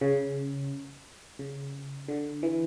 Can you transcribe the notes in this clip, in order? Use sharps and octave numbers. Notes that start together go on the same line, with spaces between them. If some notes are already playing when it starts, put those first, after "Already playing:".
C#3
C#3
D3
E3